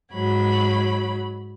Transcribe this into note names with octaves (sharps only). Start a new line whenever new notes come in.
G#2 F#3 B5